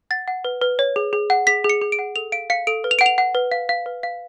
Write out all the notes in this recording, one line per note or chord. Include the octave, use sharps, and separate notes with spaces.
F#5 A6
F#5
B4
B4
C#5
G#4
G#4
F#5
G#4 B6
G#4
C#7
G#4
D7
F#5
A4 F7
F5 D7
F5 C#7
A4 D7
B4
F7
F#5 D7
F7
F#5
B4
F5
F5
B4
F5